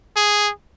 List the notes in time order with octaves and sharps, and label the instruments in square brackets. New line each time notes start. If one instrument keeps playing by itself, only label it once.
[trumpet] G#4